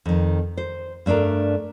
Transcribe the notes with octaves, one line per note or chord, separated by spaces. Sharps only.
F2 D#3
C5
G2 A3 D4 A4 A#4